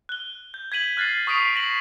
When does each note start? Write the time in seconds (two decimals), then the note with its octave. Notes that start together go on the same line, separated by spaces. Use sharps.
0.09 F#6 G7
0.54 G6
0.72 G#6 B6 D#7 F#7
0.97 F6 F#6 A6 B6 C7 D#7
1.27 C#6 D#6 B6 C7 D7 F7
1.55 A#6 C7 E7 F#7